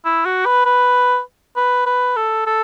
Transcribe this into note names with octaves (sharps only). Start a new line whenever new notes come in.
E4
F#4
B4
B4
B4
B4
A4
A4